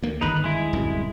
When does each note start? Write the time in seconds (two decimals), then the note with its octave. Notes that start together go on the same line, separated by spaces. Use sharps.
0.02 D2 A#3
0.21 G1 D#2 D3 D#4 B4
0.44 G#3 E4
0.73 D1 C2 F#2